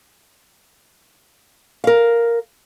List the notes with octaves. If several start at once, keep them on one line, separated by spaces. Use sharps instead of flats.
A#4 F5